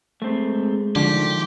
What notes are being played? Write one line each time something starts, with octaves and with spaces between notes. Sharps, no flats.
G#3 A3 C4
D3 D#3 F3 G4